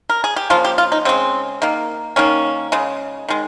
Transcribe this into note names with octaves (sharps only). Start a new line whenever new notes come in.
A#4
G#4
G4
C#3 F3 A#3 F4
G4
F4
D#4
C#3 G#3 C4
D#3 A#3
D#3 A#3 C#4
C#3 G#3
D#3 G#3